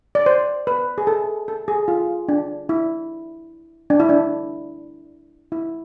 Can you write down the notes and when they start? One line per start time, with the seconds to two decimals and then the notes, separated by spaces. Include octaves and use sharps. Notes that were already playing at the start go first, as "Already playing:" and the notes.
0.15 D5
0.26 C5
0.67 B4
0.98 G#4
1.07 A4
1.48 A4
1.68 G#4
1.88 F4
2.29 D4
2.69 E4
3.90 D4
4.00 E4
4.09 D4
5.52 E4